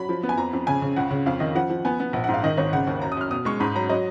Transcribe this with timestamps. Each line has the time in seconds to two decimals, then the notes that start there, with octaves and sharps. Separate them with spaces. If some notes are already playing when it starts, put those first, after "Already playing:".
Already playing: F#3 B5
0.09 F3
0.23 B3
0.29 G#5
0.37 F2 A#5
0.53 F2
0.67 C#3 G#5
0.82 C#3
0.96 C#2 F#5
1.11 C#3
1.26 F2 F5
1.40 D#3 D#5
1.55 F3 F#5
1.70 F3
1.85 B3 G#5
2.00 B3
2.13 A#1 F#5
2.24 F#5
2.28 G#2
2.34 F5
2.43 D#3 D#5
2.57 G#1 C#5
2.73 C#3 F#5
2.87 D#2
3.02 F#2 A#5
3.12 D#6
3.17 F#2 F6
3.31 B2 D#6
3.45 G#3 C#6
3.60 G#2 B5
3.75 F#3 A#5
3.89 F#3 D#5